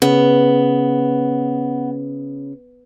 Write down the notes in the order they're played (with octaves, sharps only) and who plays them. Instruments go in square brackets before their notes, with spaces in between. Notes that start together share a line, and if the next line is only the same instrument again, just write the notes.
[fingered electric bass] C#3 [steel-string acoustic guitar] B3